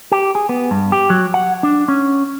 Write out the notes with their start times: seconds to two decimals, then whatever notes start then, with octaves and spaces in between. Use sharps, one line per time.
0.12 G4
0.35 G#4
0.49 B3
0.71 G2
0.92 G4
1.10 F#3
1.34 F#5
1.63 D4
1.88 C#4